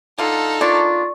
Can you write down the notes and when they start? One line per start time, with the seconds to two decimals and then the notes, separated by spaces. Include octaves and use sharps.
0.18 D3 D#4 F4 A4
0.61 A#3 D4 F4 D5 C#6